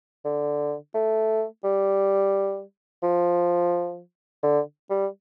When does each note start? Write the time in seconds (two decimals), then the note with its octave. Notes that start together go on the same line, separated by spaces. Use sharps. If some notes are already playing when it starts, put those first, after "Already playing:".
0.25 D3
0.94 A3
1.64 G3
3.03 F3
4.43 D3
4.90 G3